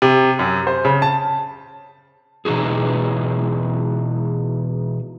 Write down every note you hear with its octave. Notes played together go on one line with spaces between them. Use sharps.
C3
F#2
C5
C#3
A5
B2 E3 D#4 F#4 G#4